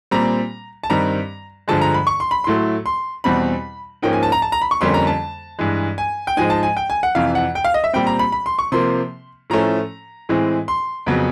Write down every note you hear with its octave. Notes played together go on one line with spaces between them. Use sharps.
A#2 G3 C4 A#5
A5
G2 D#3 G3 C4 A#5
G2 D3 F3 G#3 A5
A#5
B5
C#6
C6
B5
A2 F#3 A3 C6
C6
E2 B2 G3 C4 B5
G#2 F3 A#3 C#4 G5
G#5
A5
A#5
A5
A#5
B5
C#6
F2 D3 G3 A#3 C#4 C6
A#5
A5
G2 E3 G#3
G#5
G5
G#2 F3 G#3 G#5
A5
G#5
G5
G#5
F#5
F2 C3 E3 F5
F#5
G5
F5
D#5
E5
A#2 G3 C4 G5
A#5
B5
B5
C6
C#6
C3 F3 A#3 C6
A2 F3 A3 C#4 A#5
A2 E3 G#3 C4
C6
F2 C#3 F#3 B3